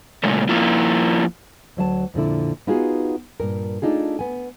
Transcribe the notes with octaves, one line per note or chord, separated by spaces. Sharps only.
A#2 C#3 G#3 A3
F3 A#3 E4 F4
D2 F#3 E5 A5
F2 A#2 D3 E4
B3 D#4 F4 F#4 G#4
G2 A#2 A#4
A3 D4 D#4 F4 G#4
B3 G#5